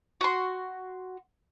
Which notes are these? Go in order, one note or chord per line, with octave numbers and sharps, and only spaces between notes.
F#4 C6